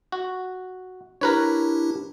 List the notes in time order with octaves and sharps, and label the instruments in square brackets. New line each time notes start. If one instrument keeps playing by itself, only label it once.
[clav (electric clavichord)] F#4
[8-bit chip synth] D4 E4 G4 [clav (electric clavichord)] A#4 B4 C#5